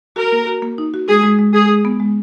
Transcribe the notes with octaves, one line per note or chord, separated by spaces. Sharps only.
F#4 A#4
A#3
F#4
A#3
D#4
F#4
G#3 G#4
G#3
G#3
G#3 G#4
G#3
B3
G#3